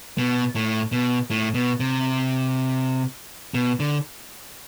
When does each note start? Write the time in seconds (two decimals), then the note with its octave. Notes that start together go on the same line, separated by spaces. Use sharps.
0.18 B2
0.55 A2
0.92 B2
1.30 A2
1.54 B2
1.80 C3
3.54 B2
3.80 D3